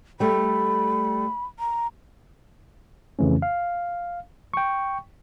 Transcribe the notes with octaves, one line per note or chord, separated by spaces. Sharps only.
G3 A3 B5
A#5
F2 C#3 E3 A3 C#4
F5
G5 C#6